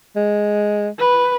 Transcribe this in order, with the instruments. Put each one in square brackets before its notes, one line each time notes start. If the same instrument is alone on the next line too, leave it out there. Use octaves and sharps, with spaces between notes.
[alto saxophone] G#3
[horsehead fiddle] B4